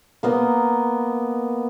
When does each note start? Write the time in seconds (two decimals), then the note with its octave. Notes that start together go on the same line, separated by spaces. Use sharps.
0.23 A#3 B3 D#5